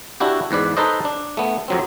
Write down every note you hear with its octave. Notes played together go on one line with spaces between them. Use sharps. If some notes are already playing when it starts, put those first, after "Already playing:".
D4 E4 F#4 G4
E2 G#2 B4 D5
D#4 A4 B4 C5 D#5
D4
A3 B3
F2 F#3 C4